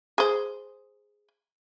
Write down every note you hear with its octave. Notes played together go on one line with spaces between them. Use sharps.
G#4 C5